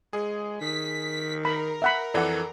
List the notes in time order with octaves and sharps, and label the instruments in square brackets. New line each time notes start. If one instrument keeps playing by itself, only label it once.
[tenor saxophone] G#3 [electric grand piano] G#4
[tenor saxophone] D#3 [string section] B6
[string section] A#4 [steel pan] B5
[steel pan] E5 F#5 B5
[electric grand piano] F2 E3 [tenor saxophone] A4 [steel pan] D5 F#5